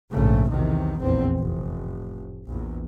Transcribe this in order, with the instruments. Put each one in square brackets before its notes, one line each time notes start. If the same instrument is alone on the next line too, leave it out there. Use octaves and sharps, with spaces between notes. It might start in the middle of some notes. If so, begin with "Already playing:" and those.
[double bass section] A#1 G#2 C#3 A3
B1 E2 C3 D#3
F1 A#1 E2 C4
F1 A2
A#1 E2